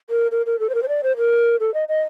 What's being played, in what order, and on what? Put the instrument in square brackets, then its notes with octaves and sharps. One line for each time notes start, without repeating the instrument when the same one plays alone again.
[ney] A#4
A#4
A#4
A4
C5
A#4
C5
D5
C5
A#4
A4
D#5
D#5